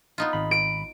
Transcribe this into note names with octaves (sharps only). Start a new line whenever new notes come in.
B3 D#4 F4
G#1 B5
D7